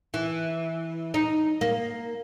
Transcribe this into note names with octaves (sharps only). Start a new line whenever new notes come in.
E3
D#4
A#3